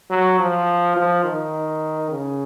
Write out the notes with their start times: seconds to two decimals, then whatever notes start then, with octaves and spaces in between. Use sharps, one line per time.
0.10 F#3
0.39 F3
0.96 F3
1.24 D#3
2.10 C#3